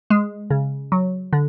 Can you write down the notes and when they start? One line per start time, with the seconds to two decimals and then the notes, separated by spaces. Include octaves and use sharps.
0.10 G#3
0.50 C#3
0.92 F#3
1.33 D3